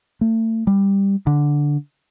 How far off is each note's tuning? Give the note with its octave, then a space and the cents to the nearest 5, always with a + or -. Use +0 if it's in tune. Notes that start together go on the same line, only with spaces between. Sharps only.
A3 +35
G3 +10
D3 -5